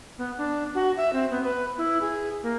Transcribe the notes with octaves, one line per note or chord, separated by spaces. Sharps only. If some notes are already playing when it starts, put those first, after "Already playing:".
B3
D4
F#4
E5
C4
B3
B4
E4
G#4
A#3